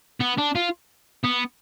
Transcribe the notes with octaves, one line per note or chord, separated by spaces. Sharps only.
B3
D4
F4
B3